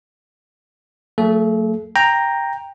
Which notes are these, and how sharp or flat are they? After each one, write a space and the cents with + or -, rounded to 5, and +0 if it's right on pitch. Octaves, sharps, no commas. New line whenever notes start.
F#3 -35 A3 +30 A4 -40
G5 +10 A#5 +0